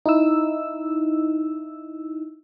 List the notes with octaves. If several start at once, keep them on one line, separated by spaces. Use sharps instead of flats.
D#4 E4 E6